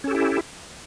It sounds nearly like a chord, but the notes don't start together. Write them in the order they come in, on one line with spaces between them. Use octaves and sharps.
C#4 A4 G4 E4